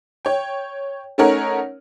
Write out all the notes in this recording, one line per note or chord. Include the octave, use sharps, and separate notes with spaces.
C#5 G5
A3 C#4 D#4 A#4 C#5 F#5